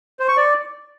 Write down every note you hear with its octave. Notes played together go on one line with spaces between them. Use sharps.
C5
C#6
D5